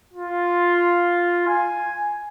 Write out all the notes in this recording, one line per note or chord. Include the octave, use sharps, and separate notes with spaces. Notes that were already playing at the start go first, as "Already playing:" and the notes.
F4
G#5